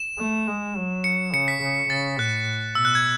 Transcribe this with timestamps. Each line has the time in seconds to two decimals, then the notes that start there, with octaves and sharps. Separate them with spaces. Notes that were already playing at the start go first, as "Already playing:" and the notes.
Already playing: E7
0.19 A3
0.47 G#3
0.76 F#3
1.04 C#7
1.33 C#3 C#7
1.48 B6
1.62 C#3
1.90 C#3 A6
2.19 A2 F#6
2.75 B2 E6
2.85 F#6
2.95 G#6